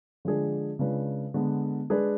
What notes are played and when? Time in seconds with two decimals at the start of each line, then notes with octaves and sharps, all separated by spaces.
0.25 D3 F3 G#3 D4 G#4
0.79 C#3 G#3 D4 F4 B4
1.34 D3 G#3 B3
1.90 G#3 D4 G#4 B4